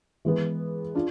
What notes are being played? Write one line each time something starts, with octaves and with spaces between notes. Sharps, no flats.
E3 G#3 B3
D4 F4